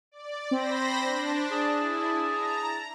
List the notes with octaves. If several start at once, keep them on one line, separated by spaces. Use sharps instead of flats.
D5
C4 C5 B5 A#6
D4
G#4 A5
E4
A#5